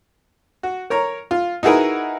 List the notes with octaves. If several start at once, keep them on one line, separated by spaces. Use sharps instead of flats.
F#4
A#4 C#5 A#5
F4
D#4 E4 F#4 G#4 A#4 B4